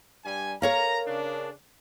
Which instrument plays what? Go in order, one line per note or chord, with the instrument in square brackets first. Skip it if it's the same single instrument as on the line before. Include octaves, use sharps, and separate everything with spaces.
[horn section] G2 G3 G#5
[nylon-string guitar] A#4 C#5 F5 [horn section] A#5
[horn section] C#3 D4